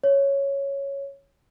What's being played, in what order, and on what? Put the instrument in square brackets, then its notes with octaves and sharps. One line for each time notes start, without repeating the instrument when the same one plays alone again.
[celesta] C#5